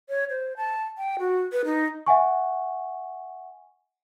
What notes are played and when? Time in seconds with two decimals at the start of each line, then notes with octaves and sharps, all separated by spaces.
0.09 C#5
0.30 C5
0.57 A5
0.98 G5
1.19 F#4
1.52 B4
1.65 D#4
2.06 E5 F#5 G#5 C#6